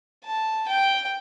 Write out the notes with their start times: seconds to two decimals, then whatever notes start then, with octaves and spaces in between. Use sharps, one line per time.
0.25 A5
0.68 G5